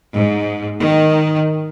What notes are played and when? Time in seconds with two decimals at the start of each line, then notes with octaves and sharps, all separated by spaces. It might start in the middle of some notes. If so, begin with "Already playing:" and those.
0.13 G#2
0.82 D#3